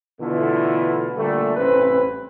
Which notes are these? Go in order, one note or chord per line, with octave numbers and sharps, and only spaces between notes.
B2 D3 E3 A3 E4 F4
A#2 D3 G3 A3
A1 G2 C3 C4 C#4 B4